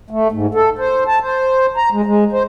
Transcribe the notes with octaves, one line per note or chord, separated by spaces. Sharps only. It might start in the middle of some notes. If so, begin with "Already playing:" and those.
A3
G#2
A4
C5
A5
C5
A#5
G#3
G#3
C5